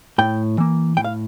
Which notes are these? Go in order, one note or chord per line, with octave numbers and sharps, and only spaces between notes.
A2 G5
E3 A#3
A2 G5
F5